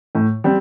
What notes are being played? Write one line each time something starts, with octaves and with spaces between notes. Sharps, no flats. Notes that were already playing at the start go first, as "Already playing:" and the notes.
A2
G3 C4